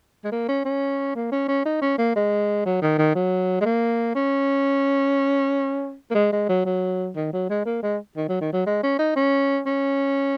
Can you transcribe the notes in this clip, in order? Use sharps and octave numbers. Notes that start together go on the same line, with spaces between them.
G#3
A#3
C#4
C#4
A#3
C#4
C#4
D#4
C#4
A#3
G#3
F#3
D#3
D#3
F#3
G#3
A#3
C#4
A#3
G#3
G#3
F#3
F#3
D#3
F#3
G#3
A#3
G#3
D#3
F#3
D#3
F#3
G#3
C#4
D#4
C#4
C#4